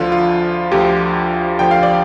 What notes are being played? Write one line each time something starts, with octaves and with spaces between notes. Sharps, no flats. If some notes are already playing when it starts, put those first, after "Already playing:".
Already playing: D2 D3 F3 F4
F4
D2 D3 F3 G4
D2 D3 F3 G5
F5
D5